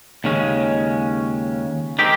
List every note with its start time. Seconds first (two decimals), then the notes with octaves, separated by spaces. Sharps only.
0.24 D#2 C#3 G#3 C#4
1.99 D#3 G#3 C4 G4